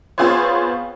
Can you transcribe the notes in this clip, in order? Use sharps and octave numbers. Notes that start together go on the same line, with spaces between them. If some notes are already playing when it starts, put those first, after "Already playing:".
B3 C4 F4 G#4 C5 C#5